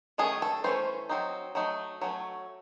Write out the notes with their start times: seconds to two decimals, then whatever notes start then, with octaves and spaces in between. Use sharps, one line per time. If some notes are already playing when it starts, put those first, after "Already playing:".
0.18 D#3 A3 C#4 G#4
0.42 A4
0.64 E3 A3 C#4 C5
1.09 F#3 C4 D#4
1.55 F#3 A3 D#4
2.01 F#3 A3 C#4